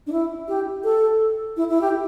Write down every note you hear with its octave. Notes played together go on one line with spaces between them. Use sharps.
D4
E4
G4
A4
E4
E4
G4